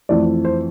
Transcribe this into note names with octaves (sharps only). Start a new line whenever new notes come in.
F2 E3 A3 D5
C5